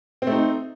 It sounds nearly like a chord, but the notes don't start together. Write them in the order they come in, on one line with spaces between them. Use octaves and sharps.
C4 A3 D#4